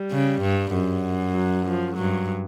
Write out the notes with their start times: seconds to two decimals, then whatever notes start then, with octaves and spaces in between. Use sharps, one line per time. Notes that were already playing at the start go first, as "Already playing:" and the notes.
Already playing: G3
0.11 C#3
0.42 G2
0.73 F#2
1.35 F#3
1.67 F3
1.97 G2 F#3